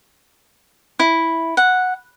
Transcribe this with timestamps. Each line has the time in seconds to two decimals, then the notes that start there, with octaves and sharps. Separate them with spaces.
0.99 E4
1.57 F#5